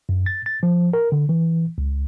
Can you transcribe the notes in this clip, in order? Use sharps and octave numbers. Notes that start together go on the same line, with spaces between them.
F#2
A6
A6
F3
A#4
D3
E3
C#2